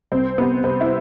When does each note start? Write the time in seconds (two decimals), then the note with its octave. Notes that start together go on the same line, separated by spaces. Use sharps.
0.12 C2 C4
0.38 C3 B3
0.64 C3 C4
0.81 E4